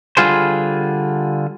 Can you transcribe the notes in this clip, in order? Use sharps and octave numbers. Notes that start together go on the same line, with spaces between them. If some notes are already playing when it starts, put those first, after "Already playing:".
D3 G3 F4 G#4 C5